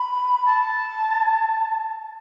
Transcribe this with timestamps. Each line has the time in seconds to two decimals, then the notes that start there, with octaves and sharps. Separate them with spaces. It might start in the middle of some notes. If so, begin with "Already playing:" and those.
Already playing: B5
0.45 A5